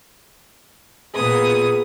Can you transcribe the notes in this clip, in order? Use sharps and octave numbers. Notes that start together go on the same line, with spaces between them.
A#2 B3 G#4 D#6